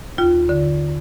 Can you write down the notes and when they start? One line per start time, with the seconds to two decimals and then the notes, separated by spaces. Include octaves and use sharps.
0.18 D#2 F4
0.49 D3